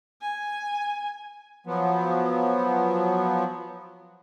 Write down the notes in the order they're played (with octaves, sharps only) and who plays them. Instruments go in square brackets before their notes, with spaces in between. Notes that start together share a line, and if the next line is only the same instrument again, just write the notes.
[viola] G#5
[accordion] F3 F#3 B3